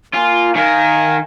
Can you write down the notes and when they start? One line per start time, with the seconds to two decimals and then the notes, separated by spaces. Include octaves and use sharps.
0.14 A#3 F4 G#5
0.55 D#3 A#4 F5 G#5